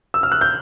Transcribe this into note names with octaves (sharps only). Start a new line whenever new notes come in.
E6
F6
F#6
G6